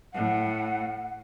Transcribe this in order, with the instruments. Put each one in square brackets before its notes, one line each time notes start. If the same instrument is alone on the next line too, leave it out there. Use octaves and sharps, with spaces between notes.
[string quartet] A2 [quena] F#5